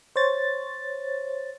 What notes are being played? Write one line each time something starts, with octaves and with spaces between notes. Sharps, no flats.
C5 C#5 A6